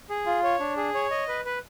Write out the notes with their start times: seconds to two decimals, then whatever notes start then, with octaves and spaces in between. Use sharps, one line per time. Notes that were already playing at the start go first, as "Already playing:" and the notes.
0.10 G#4
0.26 F4
0.43 C#5
0.60 D4
0.77 G#4
0.94 C#5
1.11 D#5
1.28 B4
1.45 B4